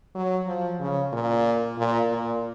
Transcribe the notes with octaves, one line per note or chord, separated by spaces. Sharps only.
F#3
F3
C#3
A#2
A#2
A#2